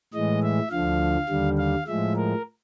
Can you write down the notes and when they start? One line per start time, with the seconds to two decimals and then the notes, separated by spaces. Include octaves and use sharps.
0.13 A2 E3 G#3 D#5
0.42 E5
0.71 D2 D3 F3 F5
1.29 D#2 D3 G3
1.58 F5
1.87 A2 F3 G#3 E5
2.16 A#4